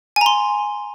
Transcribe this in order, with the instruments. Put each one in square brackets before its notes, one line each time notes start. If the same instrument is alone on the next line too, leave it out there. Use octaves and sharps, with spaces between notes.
[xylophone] G#5
A#5
C6